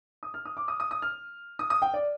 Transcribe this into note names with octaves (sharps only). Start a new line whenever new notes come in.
D#6
F6
D#6
D6
D#6
D#6
D#6
F6
D#6
D#6
G5
D5